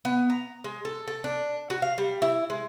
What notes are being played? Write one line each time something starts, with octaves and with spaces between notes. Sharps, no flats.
B3
A#5
G#3
A4
A4
D4
F#4
F5
G3
E4
G#3